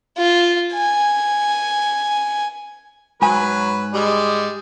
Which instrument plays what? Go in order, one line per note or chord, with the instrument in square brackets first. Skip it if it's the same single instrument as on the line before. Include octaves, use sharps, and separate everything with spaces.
[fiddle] F4
G#5
[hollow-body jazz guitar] G#2 G#5 [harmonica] F#3 B4 B5
[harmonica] G3 G#3